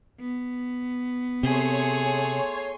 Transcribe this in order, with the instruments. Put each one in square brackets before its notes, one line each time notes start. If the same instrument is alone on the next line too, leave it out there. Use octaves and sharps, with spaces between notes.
[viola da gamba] B3
[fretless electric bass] C3 [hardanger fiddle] A3 G#4 [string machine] C#5 G#5 C6